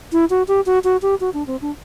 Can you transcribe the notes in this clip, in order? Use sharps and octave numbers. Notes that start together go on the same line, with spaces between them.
E4
F#4
G4
F#4
F#4
G4
F#4
D4
C4
D4